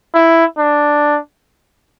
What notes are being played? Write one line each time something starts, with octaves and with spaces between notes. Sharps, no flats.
E4
D4